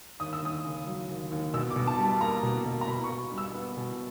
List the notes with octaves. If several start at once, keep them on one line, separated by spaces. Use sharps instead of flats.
D#2 D#6
E6
D#2 D#6
C#3
F#3
D#2
D#2
B2 E6
D6
B2
A5
G3
A5
A#3 A#5
B2
B2
A#5
B2 B5
C#6
B2
G3
E6
B3
B2